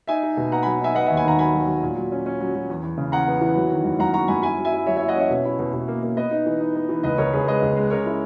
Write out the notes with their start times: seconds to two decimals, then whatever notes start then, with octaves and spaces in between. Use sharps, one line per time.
0.07 D#4 E5 G#5
0.23 D#4
0.37 B2
0.52 B3 F#5 A#5
0.63 F#3 G#5 B5
0.80 D#4 E5 G#5
0.94 B3 D#5 F#5
1.06 E5 G#5
1.10 D#2
1.17 G#5 B5
1.24 D#3 F#5 A#5
1.38 F#3 G#5 B5
1.54 F#3
1.67 F#3
1.83 A#2
1.96 F#3
2.12 C#4
2.26 C#4
2.41 F#3
2.55 F#3
2.70 E2
2.83 E2
2.98 C#3
3.12 E2 F#5 A#5
3.27 B3
3.41 E3
3.56 F#3
3.70 D#3
3.84 F#2
3.99 F#2 F#5 A#5
4.14 F#3 A#5 C#6
4.28 F#2 G#5 B5
4.42 E4 G#5 B5
4.58 F#3
4.65 E5 G#5
4.72 E4
4.87 F#3 C#5 E5
4.97 E4 C#5 E5
5.08 D#5 F#5
5.16 C#4 C#5 E5
5.30 B2
5.45 E4
5.59 B2
5.73 B2
5.88 A#3
6.03 A#3
6.17 B3 B4 D#5
6.31 D#4
6.46 E3
6.60 D#4
6.76 B3
6.89 E3
7.03 C#2 B4 D#5
7.18 C#2 A#4 C#5
7.33 C#2 G#4 B4
7.47 G#3 B4 D#5
7.62 C#2
7.76 G#3
7.90 C#4 A#4 C#5
8.06 E4